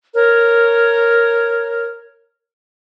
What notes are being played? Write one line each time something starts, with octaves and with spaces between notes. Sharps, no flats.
A#4 C#5